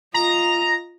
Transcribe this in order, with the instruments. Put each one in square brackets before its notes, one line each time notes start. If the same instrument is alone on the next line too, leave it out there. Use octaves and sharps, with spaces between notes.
[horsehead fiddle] F4 D#5 [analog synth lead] A#5